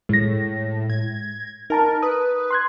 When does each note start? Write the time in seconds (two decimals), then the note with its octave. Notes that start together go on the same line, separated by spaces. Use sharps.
0.09 A2 G#3 A#6
0.90 G#6
1.70 D#4 A#4 A5 A#5
2.03 B4 D#6
2.51 C6 F#6 G#6